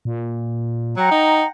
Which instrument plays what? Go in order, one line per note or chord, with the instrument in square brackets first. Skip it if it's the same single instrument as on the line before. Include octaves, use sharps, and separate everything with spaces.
[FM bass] A#2
[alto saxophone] F#3 [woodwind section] F#5 G5 A#5
[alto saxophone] D#4